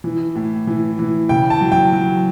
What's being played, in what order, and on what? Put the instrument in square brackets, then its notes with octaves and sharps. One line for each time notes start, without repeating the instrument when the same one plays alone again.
[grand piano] E3
A2
E3
E3
C#3 G5
A5
F#3
G5
F#3